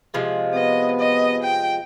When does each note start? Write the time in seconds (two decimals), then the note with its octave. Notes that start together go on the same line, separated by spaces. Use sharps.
0.14 C3 F3 G#3
0.55 B3 D#5
0.99 D#5
1.43 G5